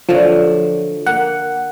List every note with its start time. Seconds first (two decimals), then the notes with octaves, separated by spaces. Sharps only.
0.09 D3 F3 F#3 A3
1.06 A#3 F#5